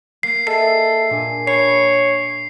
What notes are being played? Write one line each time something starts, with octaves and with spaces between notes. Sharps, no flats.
A#3 C7
G#4 A4 D#5 E5 C7
A#2 D4 G#5
C#5 B5 C7